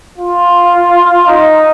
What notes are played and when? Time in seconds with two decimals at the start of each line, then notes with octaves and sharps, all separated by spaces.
0.18 F4
1.27 D#4